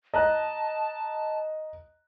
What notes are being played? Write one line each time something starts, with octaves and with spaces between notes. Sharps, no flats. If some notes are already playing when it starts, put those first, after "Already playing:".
D#5 A5 A#5 F#6